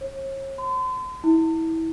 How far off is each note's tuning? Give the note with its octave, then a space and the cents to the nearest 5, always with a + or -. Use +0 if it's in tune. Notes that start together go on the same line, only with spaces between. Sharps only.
C#5 -40
C6 -40
E4 -25